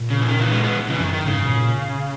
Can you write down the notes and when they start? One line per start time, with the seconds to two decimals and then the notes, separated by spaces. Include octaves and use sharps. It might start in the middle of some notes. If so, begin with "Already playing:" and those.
Already playing: A#2
0.10 C#3
0.21 E3
0.26 D#3
0.39 C#3 E3
0.51 G#3 B3
0.64 G#3 B3
0.88 C#3 E3
1.00 F#2 D#3
1.13 D#3
1.26 G#2 C#3
1.45 B2
1.50 A#2